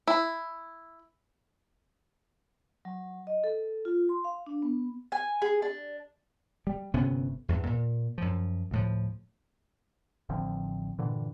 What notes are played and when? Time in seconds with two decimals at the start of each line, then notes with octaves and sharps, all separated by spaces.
0.07 E4
2.85 F#3
3.27 D#5
3.44 A4
3.85 F4
4.09 C6
4.24 F5
4.46 D4
4.62 B3
5.12 G#5
5.42 G#4
5.62 D4
6.67 G3
6.94 G1 C3 B3 C#4
7.49 E2 G2
7.67 A#2
8.18 F#2 F3
8.71 D2 A2 F3
10.29 A1 D3 F3 C4
10.99 G2 A#2 D3 E3